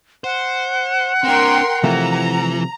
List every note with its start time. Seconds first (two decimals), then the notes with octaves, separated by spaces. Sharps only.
0.24 C5 F#5
1.24 C4 D4 A#4 G5 C6
1.84 C3 E3 F3 A3 A#5